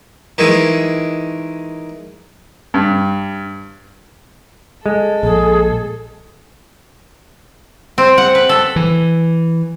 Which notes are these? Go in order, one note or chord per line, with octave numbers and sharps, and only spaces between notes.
D#3 E3 G#3
G2
G#3 A4
A#1 G#4
C4
F#5
B4
A4
E3